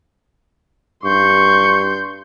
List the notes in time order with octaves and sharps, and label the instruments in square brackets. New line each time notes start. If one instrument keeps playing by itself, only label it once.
[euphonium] G2 [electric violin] C6 G6 [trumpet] C#6